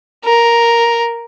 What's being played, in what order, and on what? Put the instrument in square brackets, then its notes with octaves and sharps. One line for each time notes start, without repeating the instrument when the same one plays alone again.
[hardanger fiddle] A#4